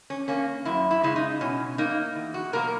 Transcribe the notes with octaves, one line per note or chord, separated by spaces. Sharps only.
C#4
A#3 C#4
F#2 E4
E4
C#3 G#3 E4
D#4
B2 C#4
A#3 D#4
E2
F#4
B2 F#3 A#3 A#4